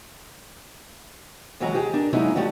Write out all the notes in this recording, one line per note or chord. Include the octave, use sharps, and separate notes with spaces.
D#2 E3 F#3 G#3 F#4 A#5
G4 G#4
D4 A#4
F#3 G#3 A#3 C#4 D#4 E4
F3 G3 A3 F#4